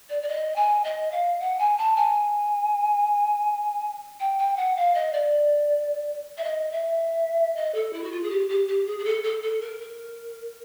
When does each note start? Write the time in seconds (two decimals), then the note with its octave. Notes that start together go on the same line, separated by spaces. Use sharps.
0.09 D5
0.22 D5
0.28 D#5
0.56 G#5
0.84 D#5
1.12 F5
1.40 F#5
1.59 G#5
1.78 A5
1.96 G#5
4.20 G5
4.39 G5
4.57 F#5
4.76 F5
4.95 D#5
5.13 D5
6.38 E5
6.44 D#5
6.72 E5
7.56 D#5
7.75 A4
7.93 E4
8.03 F#4
8.12 F4
8.24 G#4
8.30 G4
8.49 G4
8.68 G4
8.87 G#4
8.99 G#4
9.05 A4
9.24 A4
9.43 A4
9.61 A#4
9.80 A#4